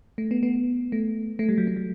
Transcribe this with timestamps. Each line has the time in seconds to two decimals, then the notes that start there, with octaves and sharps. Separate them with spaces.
0.18 A3
0.31 B3
0.43 B3
0.92 A3
1.39 A3
1.49 G3
1.58 F#3
1.67 A3
1.77 F#3